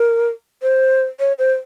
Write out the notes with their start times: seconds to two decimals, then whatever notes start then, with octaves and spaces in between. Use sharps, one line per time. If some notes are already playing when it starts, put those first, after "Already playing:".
Already playing: A#4
0.62 C5
1.20 C#5
1.39 C5